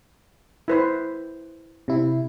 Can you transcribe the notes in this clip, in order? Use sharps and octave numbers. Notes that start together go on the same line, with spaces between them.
E4 B4 C5
C3 E4